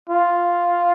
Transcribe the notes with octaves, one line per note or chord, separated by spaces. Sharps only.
F4